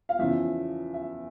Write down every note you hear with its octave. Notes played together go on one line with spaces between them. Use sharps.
F5
E2 C#3 F3 E5
E5